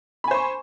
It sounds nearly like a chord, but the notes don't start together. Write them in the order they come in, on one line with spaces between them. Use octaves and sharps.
B5 G#5 C5 C#6